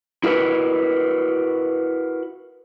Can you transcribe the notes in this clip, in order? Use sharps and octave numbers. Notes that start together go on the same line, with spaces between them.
E4 F#4 A#4 B4